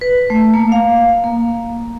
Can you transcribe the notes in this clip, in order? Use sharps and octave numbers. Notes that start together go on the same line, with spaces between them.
B4
A3
A#3
F5
A#3